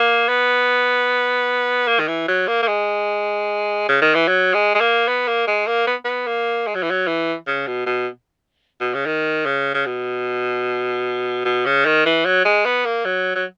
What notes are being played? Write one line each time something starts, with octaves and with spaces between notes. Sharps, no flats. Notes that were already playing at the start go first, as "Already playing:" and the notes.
Already playing: A#3
B3
A#3
D#3
E3
F#3
A#3
A#3
G#3
C#3
D#3
E3
F#3
G#3
G#3
A#3
B3
A#3
G#3
A#3
B3
B3
A#3
G#3
F#3
E3
F#3
E3
C#3
B2
B2
B2
C#3
D#3
C#3
C#3
B2
B2
C#3
D#3
E3
F#3
G#3
B3
A#3
F#3
F#3